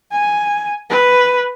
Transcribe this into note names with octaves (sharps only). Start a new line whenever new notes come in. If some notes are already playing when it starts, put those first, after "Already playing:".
G#5
B4